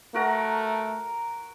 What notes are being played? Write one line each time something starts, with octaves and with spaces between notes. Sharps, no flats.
A3 F#4 A#4 A#5